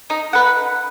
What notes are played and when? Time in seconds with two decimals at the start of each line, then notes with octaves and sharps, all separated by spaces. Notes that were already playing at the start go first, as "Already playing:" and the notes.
0.10 D#4
0.33 B4 F#5